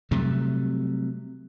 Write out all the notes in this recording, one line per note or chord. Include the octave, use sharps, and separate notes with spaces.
C3 F#3 G3 A3